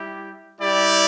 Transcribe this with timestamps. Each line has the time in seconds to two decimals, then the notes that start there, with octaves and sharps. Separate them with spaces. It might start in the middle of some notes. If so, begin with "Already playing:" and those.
Already playing: G3 E4 G4
0.61 G3 E4 G4 D5